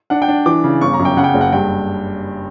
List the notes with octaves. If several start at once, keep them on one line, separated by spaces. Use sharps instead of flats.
D4 F#5
G5
D4
E3 D6
C#3
G1 C#6
A#5
F#2
G5
C#3 F#5
G5
F#5
F#1
F#5
G2 G5